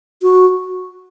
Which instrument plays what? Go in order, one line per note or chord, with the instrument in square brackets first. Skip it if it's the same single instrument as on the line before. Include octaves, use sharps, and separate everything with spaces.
[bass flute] F#4